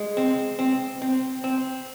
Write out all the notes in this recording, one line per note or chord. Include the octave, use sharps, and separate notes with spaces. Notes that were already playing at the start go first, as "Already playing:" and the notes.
Already playing: G#3
C4
C4
C4
C4